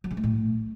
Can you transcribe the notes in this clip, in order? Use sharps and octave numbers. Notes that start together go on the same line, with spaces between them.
F#3
C#3
A3
A2